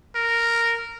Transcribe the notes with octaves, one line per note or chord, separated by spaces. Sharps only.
A#4